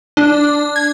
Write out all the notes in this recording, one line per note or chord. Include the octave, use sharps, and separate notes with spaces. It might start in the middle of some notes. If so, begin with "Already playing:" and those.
D4
G#6